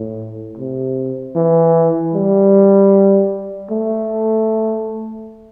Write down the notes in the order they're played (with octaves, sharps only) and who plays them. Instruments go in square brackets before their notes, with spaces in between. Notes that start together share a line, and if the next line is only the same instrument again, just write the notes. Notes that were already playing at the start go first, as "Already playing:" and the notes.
Already playing: [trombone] A2
C3
E3
G3
A3